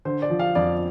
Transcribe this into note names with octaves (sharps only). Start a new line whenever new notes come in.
D3 C5
D5
F3
F5
F2 D5